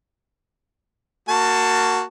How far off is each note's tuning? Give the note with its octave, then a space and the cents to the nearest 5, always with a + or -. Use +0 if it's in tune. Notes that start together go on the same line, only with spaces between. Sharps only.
A#3 -10 F#4 +0 A5 +15